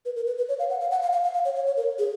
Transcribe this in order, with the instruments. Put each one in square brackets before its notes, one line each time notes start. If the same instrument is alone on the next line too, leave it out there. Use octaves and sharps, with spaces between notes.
[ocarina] B4
A#4
B4
B4
C#5
F5
F#5
F5
F#5
F5
F5
F5
F5
C#5
C#5
C#5
A#4
G#4